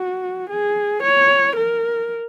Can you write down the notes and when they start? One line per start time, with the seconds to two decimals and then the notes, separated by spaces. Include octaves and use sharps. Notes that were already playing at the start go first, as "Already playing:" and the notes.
Already playing: F#4
0.50 G#4
1.03 C#5
1.56 A#4